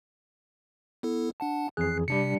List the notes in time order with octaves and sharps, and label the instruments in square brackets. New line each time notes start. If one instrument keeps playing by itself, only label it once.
[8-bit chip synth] B3 E4 A4
D4 F#5 A5
[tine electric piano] F2 E3 G#4 [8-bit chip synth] F#6 C7
[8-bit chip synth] C3 [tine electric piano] G3 D4 C#7